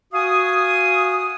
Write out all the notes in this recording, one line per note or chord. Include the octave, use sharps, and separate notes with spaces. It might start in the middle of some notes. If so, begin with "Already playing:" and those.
F#4 F5 G#5 D#6